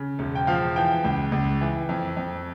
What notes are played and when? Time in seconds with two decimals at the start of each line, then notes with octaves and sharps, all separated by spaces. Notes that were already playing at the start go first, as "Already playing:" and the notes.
Already playing: C#3
0.19 E1
0.35 G5
0.47 F3 F5
0.76 E3 G5
1.04 C#2
1.32 C#2
1.61 E3
1.89 F2
2.17 F2